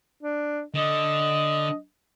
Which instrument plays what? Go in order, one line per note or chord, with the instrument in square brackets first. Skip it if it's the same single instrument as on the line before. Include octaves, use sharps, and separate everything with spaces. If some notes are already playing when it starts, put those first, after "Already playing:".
[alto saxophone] D4
[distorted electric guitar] D3 [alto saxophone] D#5